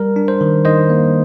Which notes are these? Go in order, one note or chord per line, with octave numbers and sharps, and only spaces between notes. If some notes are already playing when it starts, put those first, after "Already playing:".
Already playing: G3 A#4
D4
C5
D#3
D#3 C5 D#5
A#3